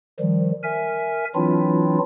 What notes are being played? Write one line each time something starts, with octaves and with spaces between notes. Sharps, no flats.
D#3 F3 G3
A#4 E5 G#5
E3 F#3 C4 D4 E4 F4